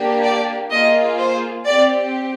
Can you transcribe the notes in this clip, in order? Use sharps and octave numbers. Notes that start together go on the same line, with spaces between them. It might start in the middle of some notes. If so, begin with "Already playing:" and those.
Already playing: A#3 D4 G4
D5
A#3 F4 G#4 D#5
C5
C4 G4 D5